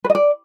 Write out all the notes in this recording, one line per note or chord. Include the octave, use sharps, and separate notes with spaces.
B4
D#5
D5